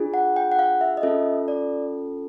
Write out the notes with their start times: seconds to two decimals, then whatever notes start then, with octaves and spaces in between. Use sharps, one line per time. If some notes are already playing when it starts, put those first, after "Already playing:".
Already playing: D4 F4 G#4
0.14 F#5
0.36 G5
0.52 F#5
0.59 F5
0.81 E5
0.97 D#5
1.03 C#4 F4 A4 E5
1.48 D5